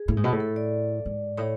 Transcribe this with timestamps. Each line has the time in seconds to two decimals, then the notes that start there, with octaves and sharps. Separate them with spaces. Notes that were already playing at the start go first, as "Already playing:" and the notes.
Already playing: G#4
0.08 A2
0.17 G#2
0.24 B2
0.32 A2
0.40 A4
0.56 D5
1.06 G#2
1.37 A2 C#5